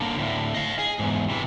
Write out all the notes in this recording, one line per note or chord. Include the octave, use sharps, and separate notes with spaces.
D3 A#3
D2 A2
D#5 F5
G#4
E2 G#2
C3 E3